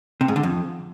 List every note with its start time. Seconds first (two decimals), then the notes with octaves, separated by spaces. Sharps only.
0.21 C3
0.28 G#2
0.36 D3
0.43 F2